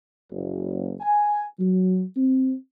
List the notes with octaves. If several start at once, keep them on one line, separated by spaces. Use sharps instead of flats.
F#1
G#5
F#3
C4